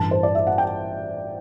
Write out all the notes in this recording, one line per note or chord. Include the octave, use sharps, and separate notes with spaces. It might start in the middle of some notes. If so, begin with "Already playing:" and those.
Already playing: A1 G2 E3 A5
C5
D5
E5
F#5
G5